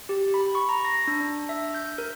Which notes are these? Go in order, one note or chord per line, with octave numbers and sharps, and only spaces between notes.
G4
B5
C#6
A#5
A#6
D4
D4
E5
G6
A#4